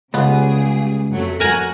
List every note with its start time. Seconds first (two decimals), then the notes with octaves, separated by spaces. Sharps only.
0.14 C#2 C#3 G3 B3 G#4
1.09 F2 F#3 A3
1.40 F2 F#4 A#4 G#5 A#5 F#6